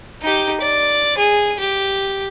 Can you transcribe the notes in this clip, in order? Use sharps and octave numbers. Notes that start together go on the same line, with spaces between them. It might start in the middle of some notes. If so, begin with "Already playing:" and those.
D#4 G4
D5
G#4
G4